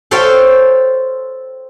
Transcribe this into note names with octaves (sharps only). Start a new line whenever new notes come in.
A4 C5 C#5 E5 F5 G5